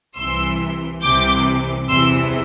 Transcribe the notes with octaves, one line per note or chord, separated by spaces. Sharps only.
C2 C3 E3 C6 E6
C2 C3 E3 D6 G6
E2 C3 E3 C6 E6